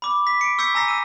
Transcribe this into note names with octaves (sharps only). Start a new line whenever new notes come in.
B5 D6
B6
C#7 D7
C#6 E6 G6 B6 C#7
G#5 A#5 E6 A#6 C7
E6 D#7